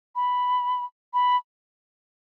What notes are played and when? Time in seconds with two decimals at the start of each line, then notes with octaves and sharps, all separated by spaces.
0.16 B5
1.14 B5